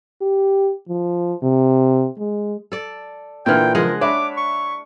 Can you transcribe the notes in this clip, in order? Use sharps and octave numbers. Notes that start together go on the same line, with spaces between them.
G4
F3
C3
G#3
A4 D5
A#2 D3 E3 A#3 F4 G5 F6
C#3 F3 G#3 A#4 D#5 F#5
D4 C#5 E5 B5 D6
C#6